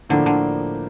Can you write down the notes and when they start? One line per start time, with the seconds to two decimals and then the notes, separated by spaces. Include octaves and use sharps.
0.09 A2 D3 F3 A#3 D4 A4
0.26 D3